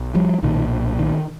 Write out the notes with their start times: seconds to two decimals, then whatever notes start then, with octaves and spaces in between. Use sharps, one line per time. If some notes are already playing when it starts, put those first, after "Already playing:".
Already playing: B1
0.15 F3 G3
0.43 B1 A#2 D#3
0.99 D#3